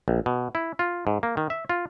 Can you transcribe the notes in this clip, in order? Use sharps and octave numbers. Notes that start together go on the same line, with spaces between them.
A#1
B2
E4
F4
G#2
A#3
D#3
E5
F4